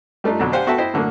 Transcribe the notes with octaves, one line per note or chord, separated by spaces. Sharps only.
G3 A3 D4 D#4 F4
F2 B2 D3 F#3
D4 G4 C5 F5 F#5 G#5
B3 F#4 A4 E5 G5 A5
E4 C5 D#5 E5 G5
A2 D3 F#3 A#3